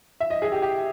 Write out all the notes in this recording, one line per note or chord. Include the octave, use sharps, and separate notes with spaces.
E5
D#5
G#4
G4
G4